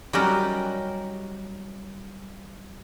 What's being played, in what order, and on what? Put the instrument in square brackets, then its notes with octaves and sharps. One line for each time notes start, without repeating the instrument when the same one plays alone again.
[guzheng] F#3 G3 C#4 D#4 G4 A#4